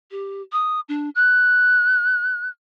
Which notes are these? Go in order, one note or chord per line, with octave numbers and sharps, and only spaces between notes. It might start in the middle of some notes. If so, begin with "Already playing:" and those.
G4
D#6
D4
F#6